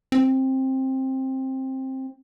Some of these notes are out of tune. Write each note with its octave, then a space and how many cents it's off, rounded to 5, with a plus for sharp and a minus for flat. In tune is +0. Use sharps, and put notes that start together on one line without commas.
C4 +15